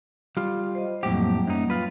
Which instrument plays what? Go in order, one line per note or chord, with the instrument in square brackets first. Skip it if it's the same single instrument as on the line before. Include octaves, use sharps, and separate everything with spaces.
[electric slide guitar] G3 F4
[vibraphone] C5 D#5
[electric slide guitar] F2 A2 G4 [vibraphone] F#3 G3 A#3
[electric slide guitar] F#2 D#4
F4 B4